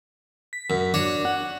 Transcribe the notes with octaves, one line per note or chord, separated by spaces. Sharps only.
B6
F#2
D4 F#4 C#5
F#5